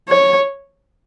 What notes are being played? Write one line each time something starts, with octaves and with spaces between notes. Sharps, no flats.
C#5